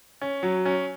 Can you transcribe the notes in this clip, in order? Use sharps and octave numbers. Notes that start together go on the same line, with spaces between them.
C#4
F#3
C#4